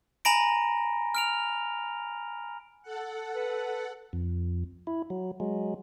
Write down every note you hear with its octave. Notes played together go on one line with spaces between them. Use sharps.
G#5 A#5 B5 A#6 D7
F6 D7 F7
A4 F#5
B4
F2
E4
F#3
F#3 G#3